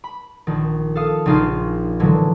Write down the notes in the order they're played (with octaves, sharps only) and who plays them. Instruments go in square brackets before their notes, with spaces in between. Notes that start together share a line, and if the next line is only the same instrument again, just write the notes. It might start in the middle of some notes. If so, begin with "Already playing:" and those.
[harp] B5
A#1 D#3
A4 F5 D#6
A#1 C#3 D#4 F4 F5 F6
A2 D3 E3 F#3 G#3